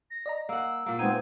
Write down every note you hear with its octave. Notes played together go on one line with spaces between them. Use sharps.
A#6
D5 D#5 A#5
A#3 F#5 E6
A#2 A#3
G#3 B3 C4 D#4 G#5 D#7